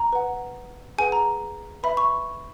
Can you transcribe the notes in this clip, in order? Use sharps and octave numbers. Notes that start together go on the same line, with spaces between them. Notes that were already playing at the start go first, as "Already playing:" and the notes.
Already playing: A#5
B4 F#5
G#4 B4 F#5 G#5
A#5
B4 E5 B5
C#6